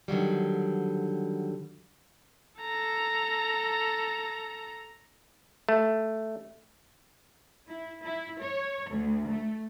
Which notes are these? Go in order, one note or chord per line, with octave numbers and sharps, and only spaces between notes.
D3 D#3 F#3 G3
A4 A#5
A3
E4
E4
C#5
D2
A3